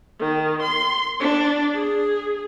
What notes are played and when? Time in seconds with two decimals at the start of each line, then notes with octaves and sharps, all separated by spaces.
0.20 D#3
0.62 C6
1.20 D4
1.75 G#4